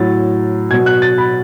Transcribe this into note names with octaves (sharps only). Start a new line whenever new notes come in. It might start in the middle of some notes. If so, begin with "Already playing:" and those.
Already playing: A2 F#3 A6
B2 F#3 G#6
F#6
A6
B5